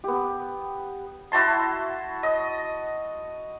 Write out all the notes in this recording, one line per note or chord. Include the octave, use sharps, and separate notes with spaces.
B3 G4
E4 F#4 A5 C6
D#5